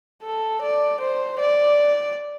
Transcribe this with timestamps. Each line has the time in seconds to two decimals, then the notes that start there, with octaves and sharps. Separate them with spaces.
0.23 A4
0.62 D5
1.00 C5
1.39 D5